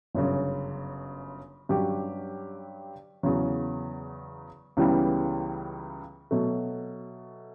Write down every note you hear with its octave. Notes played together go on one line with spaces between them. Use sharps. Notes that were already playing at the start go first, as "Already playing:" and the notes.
G1 F#2 C#3
G2 F#3 C#4 G4
E2 C#3 F#3
C#2 C#3 E3 G3 B3
B2 F#3 A3